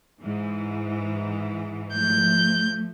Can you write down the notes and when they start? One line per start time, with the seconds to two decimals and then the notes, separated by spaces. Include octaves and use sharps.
0.21 G#2 E3
1.94 F3 A3 G6